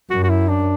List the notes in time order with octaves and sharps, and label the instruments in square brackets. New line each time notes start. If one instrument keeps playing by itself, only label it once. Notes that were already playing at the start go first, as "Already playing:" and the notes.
[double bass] F#2 [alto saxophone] F#4
[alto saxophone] F#4
E4
D4